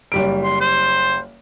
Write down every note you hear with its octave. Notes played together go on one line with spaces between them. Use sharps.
F#1 G3 D7
C6
C5